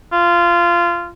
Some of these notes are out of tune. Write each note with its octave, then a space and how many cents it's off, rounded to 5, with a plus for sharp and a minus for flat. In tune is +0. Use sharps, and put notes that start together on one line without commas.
F4 -20